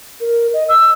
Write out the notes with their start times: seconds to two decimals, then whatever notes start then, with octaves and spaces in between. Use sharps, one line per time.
0.20 A#4
0.53 D#5
0.69 E6